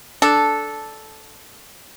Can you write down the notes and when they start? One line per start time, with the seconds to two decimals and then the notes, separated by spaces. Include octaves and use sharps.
0.22 D4 A4